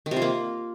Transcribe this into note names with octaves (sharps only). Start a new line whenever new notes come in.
D#3
C3
F4
A#3